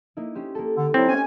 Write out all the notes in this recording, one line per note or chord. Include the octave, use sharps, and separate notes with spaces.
A#3 D#4 E4
C#4 G4 C5
A#3 A4
D3
F#3 C4 D#4 E4 D6
C#4 G#5